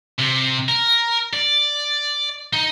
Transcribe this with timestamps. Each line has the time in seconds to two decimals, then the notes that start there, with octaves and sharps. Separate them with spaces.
0.19 C3
0.69 A#4
1.33 D5
2.53 D#4